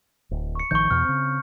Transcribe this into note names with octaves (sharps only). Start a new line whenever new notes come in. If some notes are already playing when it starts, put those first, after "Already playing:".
D1
C#6 C#7
A1 D#3 F3 C#6 G6
E2 B2 F6
C#3 C4